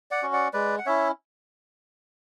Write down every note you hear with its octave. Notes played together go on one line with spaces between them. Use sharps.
D5 F#5
C#4 F#4
D5 F#5
G#3 B4 D5
F#5
C#4 E4 C#5 E5